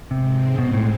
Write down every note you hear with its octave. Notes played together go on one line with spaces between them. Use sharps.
G#2 C3 G#3 C4
B2
A2